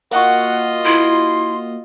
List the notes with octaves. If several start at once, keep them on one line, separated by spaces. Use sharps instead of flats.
A#3 F4 F#4 D#5 F#5
E4 C6